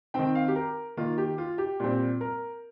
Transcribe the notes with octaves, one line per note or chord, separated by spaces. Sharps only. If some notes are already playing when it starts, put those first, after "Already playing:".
D#3 C4 G5
F5
G4
A#4
D#3 A#3 F4
G4
F4
G4
A#2 G3 C4
A#4